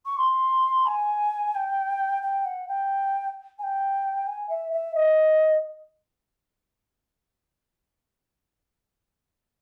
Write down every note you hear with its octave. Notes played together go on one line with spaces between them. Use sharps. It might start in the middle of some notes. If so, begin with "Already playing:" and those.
C#6
C6
G#5
G5
G5
F#5
G5
G#5
G5
G#5
E5
E5
D#5